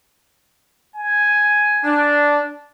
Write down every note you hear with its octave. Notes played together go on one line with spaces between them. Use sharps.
G#5
D4